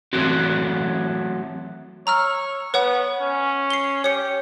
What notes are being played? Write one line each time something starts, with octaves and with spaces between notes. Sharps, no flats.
E3 F#3 A3 C4 F#4
C#5 A#5 E6 F6
B3 B4 C#5 F#5
C#4
C7 G7
G4 C#5 C#7